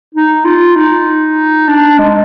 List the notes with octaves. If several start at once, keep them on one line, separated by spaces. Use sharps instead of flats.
D#4
F4
D#4
D4
G#3